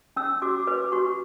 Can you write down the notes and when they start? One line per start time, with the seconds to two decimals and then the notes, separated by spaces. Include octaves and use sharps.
0.16 C#4 E6
0.42 F#4 D6
0.67 B4 D6
0.92 F#4 C#6